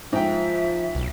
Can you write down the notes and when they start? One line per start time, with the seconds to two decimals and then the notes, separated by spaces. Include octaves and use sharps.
0.13 G#2 F3 E5 G5
0.95 B1